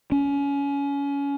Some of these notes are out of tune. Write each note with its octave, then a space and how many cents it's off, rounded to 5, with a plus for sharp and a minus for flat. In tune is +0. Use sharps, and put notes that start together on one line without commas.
C#4 +25